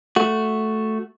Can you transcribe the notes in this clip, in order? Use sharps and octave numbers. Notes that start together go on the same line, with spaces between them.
A3 F#4